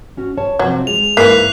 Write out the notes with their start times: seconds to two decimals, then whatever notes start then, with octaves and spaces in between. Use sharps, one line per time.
0.17 C#4 F#4
0.37 C#5 A5
0.59 C3 F3 F#3 C4
0.87 G#3 F7
1.17 G#2 E3 A#3 F#6 B6 C7